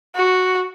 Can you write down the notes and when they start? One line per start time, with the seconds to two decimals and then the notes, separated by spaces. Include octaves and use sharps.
0.16 F#4